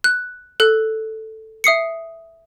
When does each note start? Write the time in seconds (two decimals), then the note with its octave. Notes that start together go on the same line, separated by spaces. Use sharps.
0.04 F#6
0.60 A4 F#6
1.64 E5 D#6 C7 C#7